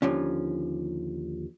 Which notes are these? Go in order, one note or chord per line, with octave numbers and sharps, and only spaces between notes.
D#2 D3 F3 C#4